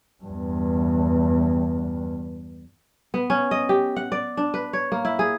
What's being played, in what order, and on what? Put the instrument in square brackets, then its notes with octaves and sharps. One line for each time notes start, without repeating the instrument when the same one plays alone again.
[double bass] E2 G2
[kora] B3
C#4
D#5
G4
F#5
D5
D4
B4
C#5
A#3
E4
G#4